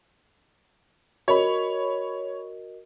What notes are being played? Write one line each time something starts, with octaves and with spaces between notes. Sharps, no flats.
F#4 A#4 C#5 D#5 B5